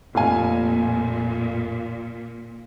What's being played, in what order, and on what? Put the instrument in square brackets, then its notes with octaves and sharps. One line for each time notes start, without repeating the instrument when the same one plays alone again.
[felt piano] F1 F4 G#5 [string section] A#2